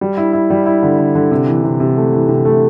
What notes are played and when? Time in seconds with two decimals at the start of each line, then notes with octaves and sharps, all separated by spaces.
0.01 G3
0.17 E4
0.33 E4
0.50 G3
0.66 E4
0.82 D3
0.98 D3
1.15 D3
1.31 C3
1.47 E3
1.64 C3
1.80 C3
1.97 A3
2.13 E3
2.29 C3
2.45 A3